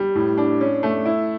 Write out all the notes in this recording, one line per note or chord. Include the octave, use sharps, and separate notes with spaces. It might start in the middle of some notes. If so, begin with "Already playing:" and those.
Already playing: G3
A2
D4
C#4
A3
E4